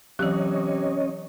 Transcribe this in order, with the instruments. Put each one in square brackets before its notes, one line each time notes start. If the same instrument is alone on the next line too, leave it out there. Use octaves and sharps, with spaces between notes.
[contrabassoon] C3 [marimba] E3 F#3 [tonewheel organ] C#4 C#5 D#5